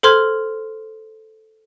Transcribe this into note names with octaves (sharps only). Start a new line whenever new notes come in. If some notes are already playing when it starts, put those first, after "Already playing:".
A4 C5 C6 F6 G#6